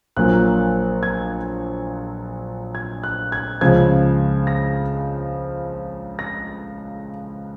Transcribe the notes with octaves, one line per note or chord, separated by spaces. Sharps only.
A#1 A#2 F#3 A#3 F#6
G#6
G#6
F#6
G#6
C#2 C#3 F3 G#6
A#6
A#6